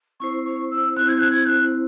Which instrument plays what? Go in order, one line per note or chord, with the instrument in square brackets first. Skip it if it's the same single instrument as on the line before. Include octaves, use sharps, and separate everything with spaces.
[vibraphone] C4 E4 C5 [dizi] C#6
[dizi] C#6
E6
[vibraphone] C4 E4 C5 [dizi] F#6
[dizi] G#6
F#6
G#6
G#6
F#6